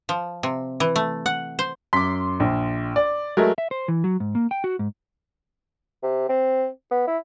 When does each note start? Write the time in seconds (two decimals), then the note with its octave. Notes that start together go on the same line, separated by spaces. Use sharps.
0.09 F3
0.43 C3
0.80 E3
0.96 A3
1.26 F#5
1.59 C5
1.93 F#2 C6 D6 B6
2.40 A#1
2.96 D5
3.37 F#3 G#3 A3 A#4
3.58 E5
3.71 C5
3.88 E3
4.04 F#3
4.20 G#2
4.35 A#3
4.51 G5
4.64 F#4
4.79 G#2
6.03 C3
6.29 C4
6.91 B3
7.07 E4